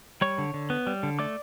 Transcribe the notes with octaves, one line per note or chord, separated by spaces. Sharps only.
G3 C#5 C#6
D3
D3
B3
G3
D3
A3 D5 D6